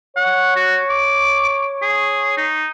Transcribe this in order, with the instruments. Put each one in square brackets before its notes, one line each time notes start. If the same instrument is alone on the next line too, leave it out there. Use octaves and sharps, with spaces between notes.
[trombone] C#5 [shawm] F#5
[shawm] F#4
D6
G#4
D#4